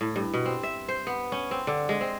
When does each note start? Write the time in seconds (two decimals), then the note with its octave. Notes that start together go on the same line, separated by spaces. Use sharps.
0.01 A2
0.16 G2
0.34 B2
0.45 C4
0.63 E5
0.89 C5
1.07 B3
1.32 C#4
1.51 C4
1.67 D3
1.89 G#3
2.01 C4